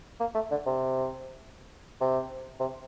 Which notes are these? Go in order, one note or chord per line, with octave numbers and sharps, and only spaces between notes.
A#3
A3
D3
C3
C3
C3